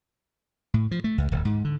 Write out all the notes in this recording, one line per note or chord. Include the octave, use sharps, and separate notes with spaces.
A2
F3
A3
C#2
D1
G#2
D3